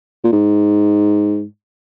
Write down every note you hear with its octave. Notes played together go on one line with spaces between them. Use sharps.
A#2
G#2